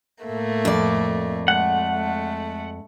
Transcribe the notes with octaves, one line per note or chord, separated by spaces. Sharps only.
A2 A3 A#3
F2 D5
G#3 A3 F#5
G#3 A3